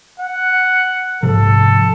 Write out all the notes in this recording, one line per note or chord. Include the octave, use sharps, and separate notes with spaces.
F#5
G#2 C3 F3 A4